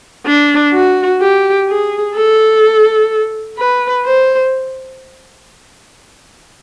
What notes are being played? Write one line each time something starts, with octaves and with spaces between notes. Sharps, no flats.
D4
F#4
G4
G#4
A4
B4
C5